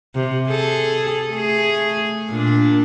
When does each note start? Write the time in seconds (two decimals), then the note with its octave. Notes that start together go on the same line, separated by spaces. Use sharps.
0.15 C3
0.49 G#4 A4
1.31 A3 G#4
2.29 A#2 D4